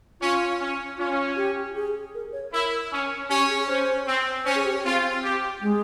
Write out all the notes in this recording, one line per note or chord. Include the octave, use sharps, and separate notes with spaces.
C#4 F4
C#4
C#4 F4
G4
G#4
A#4
C#5
E4 A#4
C#4
C#4 G4
G#4
C#4 C5
C4
C#4 C5
G#4
G4
C4 F4
G4
G#3